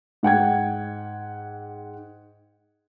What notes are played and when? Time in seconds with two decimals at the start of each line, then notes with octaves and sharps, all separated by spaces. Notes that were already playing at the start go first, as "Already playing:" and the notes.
0.23 G#2 F#5 G5 G#6